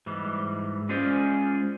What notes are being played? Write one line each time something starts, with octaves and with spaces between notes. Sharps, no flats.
G#2 E3 G3
G#3 C#4 F4 G#4 C5 D5